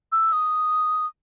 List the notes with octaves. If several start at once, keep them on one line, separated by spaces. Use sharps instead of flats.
E6
D#6